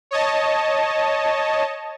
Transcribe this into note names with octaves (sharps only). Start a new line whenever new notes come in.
C#5 D#5 A5